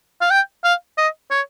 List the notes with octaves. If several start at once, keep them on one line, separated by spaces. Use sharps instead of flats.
F5
G5
F5
D#5
C#5